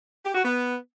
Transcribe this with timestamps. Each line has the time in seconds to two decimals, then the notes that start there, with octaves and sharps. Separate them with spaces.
0.25 G4
0.34 F#4
0.44 B3